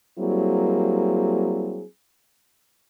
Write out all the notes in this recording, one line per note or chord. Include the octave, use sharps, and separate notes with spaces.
F#3 G3 A#3 C4 E4 G#4